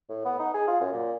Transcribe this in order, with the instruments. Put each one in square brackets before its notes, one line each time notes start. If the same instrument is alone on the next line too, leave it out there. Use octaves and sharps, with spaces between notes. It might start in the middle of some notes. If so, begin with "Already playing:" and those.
[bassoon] A2
B3
D#4
G#4
F4
F#2
A#2